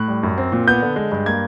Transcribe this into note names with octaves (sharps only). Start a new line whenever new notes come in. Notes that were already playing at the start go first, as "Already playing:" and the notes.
Already playing: A2 F#6
G3
F#2
C4
A#2
B3 G6
D3
G#3
G2
A#3 G#6